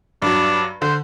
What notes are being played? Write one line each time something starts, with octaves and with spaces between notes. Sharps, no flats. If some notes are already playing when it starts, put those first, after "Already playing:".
G2 F#3 D4
D3 C5